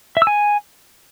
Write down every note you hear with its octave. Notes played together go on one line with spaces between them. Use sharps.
E5
E6
G#5